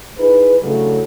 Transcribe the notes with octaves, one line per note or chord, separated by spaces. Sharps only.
D#4 E4 G#4 B4
C#3 F#3 A3 D4 E4 A4